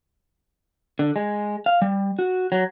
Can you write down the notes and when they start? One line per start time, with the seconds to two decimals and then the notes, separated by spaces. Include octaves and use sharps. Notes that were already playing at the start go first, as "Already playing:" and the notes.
0.99 D3
1.16 G#3
1.66 F5
1.82 G3
2.19 F#4
2.52 F#3